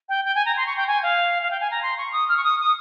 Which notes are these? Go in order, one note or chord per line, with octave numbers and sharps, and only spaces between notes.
G5
G5
G#5
A#5
C6
C#6
G5
G#5
F5
F5
G5
G#5
A#5
C6
C#6
D#6
F6
C#6
D#6
D#6